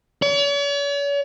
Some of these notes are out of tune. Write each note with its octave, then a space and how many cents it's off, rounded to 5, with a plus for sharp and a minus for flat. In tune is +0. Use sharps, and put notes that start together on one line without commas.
C#5 +45